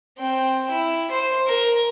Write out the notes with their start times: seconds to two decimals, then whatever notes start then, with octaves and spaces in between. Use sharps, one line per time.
0.19 C4 G5
0.71 E4
1.11 C5
1.47 A#4